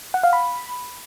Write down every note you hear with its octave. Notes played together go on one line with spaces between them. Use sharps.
F#5
F5
B5